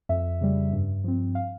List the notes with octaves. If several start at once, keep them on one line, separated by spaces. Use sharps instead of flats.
F2 E5
C#3 G3
G2
F3 C4
F5